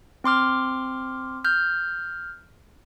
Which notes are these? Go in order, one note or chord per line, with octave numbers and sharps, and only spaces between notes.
C4 C6 D6 F6
F6 G6